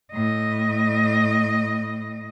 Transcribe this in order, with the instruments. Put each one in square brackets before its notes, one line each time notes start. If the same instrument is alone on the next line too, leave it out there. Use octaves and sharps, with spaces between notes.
[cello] A2 D#5